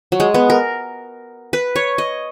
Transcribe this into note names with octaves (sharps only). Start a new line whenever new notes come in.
F#3
G#3
B3
A#4
B4
C#5
D#5